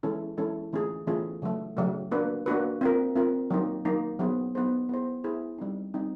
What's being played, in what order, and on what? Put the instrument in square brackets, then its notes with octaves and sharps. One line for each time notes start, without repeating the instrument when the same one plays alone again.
[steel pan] E3 G#3 C#4 E4 A4
E3 G#3 C#4 E4 A4
E3 A3 C#4 F4 G#4
E3 A3 C#4 F4 G#4
C#3 F#3 A3
C#3 F#3 A3
A#3 D4 F#4 B4
A#3 D4 F#4 B4
C4 F4 A#4
C4 F4 A#4
F#3 A#3 D#4
F#3 A#3 D#4
F#3 B3 D#4 G#4 C5
F#3 B3 D#4 G#4 C5
B3 E4 G#4 C5
B3 E4 G#4 C5
G3 C4 D#4
G3 C4 D#4